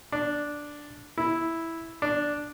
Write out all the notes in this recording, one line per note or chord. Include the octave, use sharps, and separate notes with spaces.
D4
E4
D4